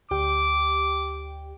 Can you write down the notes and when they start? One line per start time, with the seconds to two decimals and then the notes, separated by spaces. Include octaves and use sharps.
0.11 D2 G4 G5 D6